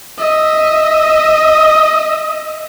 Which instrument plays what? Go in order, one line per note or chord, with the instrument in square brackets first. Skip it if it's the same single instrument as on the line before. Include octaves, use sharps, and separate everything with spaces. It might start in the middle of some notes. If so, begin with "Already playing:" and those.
[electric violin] D#5 E5